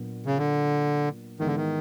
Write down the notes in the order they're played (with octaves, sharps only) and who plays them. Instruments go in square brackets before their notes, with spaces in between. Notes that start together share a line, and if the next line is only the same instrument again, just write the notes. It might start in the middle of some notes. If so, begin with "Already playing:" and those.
Already playing: [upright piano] A#2 F#3 B3 D4
[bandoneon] C#3
D3
[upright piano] G#2 E3 G#3 B3 [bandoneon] D#3
[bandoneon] D3
D#3